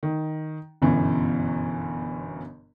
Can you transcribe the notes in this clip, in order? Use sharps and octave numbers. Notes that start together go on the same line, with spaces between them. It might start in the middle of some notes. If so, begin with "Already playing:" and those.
D#3
G1 F#2 B2 E3